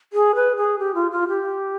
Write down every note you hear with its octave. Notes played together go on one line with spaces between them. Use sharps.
G#4
B4
G#4
G4
F4
F4
G4